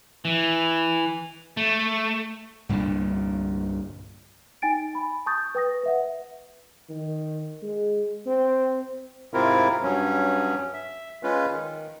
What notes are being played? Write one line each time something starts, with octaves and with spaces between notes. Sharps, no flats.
E3
A3
C2 G2 A#2 D3
D#4 G5 G#5 A6 D7
B5
A5 C#6 D#6 G6 A6
B4 G5 D#6 A#6
B4 E5 F#5
D#3
G#3
C4
G#2 C3 C4 E4 F4 A#4
G2 F#3 C#4
E5
G#3 C#4 F4 B4
D#3